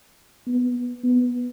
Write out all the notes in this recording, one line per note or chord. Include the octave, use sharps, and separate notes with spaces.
B3
B3